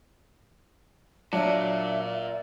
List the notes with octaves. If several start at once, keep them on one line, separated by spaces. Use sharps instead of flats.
A#2 F#3 D4 E5